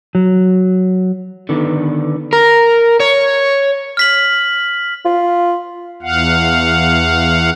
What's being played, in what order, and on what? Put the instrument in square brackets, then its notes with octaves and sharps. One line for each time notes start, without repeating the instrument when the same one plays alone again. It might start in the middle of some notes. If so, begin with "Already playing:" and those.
[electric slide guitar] F#3
D3 D#3 B3
A#4
C#5
[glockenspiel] F6 B6 F#7
[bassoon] F4
[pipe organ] E2 F5 F#5